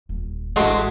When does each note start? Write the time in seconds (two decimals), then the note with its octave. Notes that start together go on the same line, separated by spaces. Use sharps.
0.09 D#1
0.56 A1 D3 G#3 F#4 D#5 E5 C6